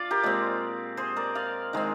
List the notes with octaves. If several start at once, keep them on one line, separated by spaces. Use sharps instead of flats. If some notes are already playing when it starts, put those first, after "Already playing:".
Already playing: F4 D5 F5
G4 A#4
A#2 G#3 C4
G#4 C5
A#4 D5
D5 F5
D#3 G#3 C4